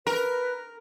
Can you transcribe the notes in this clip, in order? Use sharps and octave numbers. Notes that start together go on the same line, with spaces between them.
A#4 B4